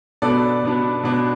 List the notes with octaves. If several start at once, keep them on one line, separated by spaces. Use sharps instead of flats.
B2 B3 D4 A4 D5
B2 B3 D4
B2 B3 D4